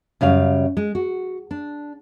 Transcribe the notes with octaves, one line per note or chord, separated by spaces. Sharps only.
F#2 C#3 G3 F5
G#3
F#4
D4